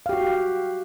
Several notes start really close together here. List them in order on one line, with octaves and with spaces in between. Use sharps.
F5 G4 F#4